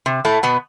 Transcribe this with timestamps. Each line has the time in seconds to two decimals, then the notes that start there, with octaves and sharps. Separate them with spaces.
0.06 C3
0.25 A2 A3
0.43 B2 B3